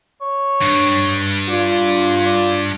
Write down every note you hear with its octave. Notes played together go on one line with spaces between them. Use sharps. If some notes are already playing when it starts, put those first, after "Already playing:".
C#5
G2
F4 D5
D5